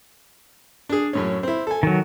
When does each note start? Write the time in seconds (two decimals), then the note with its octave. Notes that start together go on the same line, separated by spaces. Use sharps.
0.89 D4 G#4
1.13 F#2 A2 C#4
1.43 C4 E4
1.67 A4 G#5
1.83 D#3 F#3